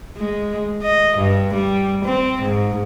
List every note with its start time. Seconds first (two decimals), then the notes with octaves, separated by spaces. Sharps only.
0.16 G#3
0.82 D#5
1.18 G2
1.54 G3
2.05 C4
2.42 G#2